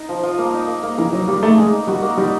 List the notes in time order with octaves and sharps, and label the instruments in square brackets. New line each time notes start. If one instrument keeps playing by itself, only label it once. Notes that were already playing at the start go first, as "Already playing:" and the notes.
Already playing: [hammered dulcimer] D#4
F3
F3
A#3
D#4
A#3
A#3
[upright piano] E3 [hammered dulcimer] A#3
[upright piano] F#3 [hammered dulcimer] D#4
[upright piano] G3 [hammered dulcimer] A#3
[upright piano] A3 [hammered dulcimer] D#4
[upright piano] G#3 [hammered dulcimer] D#4
[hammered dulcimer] D#4
[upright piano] G3 [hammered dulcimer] F#4
[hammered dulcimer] A#3
[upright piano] G3 [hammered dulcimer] D#4